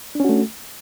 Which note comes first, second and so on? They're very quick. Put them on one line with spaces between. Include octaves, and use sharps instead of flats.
D4 C#4 F#4 A3